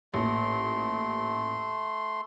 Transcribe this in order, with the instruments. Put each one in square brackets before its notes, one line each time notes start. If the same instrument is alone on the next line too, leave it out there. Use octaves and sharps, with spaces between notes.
[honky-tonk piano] A1 A#2 [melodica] A3 C6